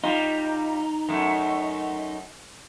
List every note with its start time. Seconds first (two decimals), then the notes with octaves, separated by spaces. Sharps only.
0.04 G3 D#4 F4
1.09 F#2 A3